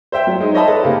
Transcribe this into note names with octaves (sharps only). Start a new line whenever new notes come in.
C5 E5 G5
F#3
G#3 D#4
C5 C#5 D#5 E5 A5 B5
A4 B4
C#3 A#3 G4